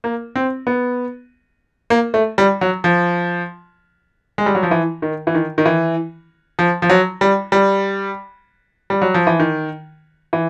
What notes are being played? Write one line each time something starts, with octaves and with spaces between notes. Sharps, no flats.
A#3
C4
B3
A#3
A3
G3
F#3
F3
G#3
G3
F#3
F3
E3
D#3
E3
D#3
D#3
E3
F3
F3
F#3
G3
G3
G3
F#3
F3
E3
D#3
E3